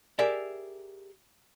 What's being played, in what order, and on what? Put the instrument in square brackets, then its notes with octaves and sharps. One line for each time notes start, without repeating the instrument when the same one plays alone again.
[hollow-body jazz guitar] G4 G#4 A#4 D5 E5